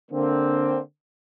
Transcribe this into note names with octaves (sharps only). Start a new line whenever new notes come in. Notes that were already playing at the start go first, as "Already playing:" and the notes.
D3 A#3 C4